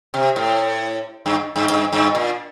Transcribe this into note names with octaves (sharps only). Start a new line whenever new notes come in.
C3
A2
G2
G2
G2
G2
A#2